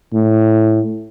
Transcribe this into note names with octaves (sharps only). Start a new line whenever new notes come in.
A2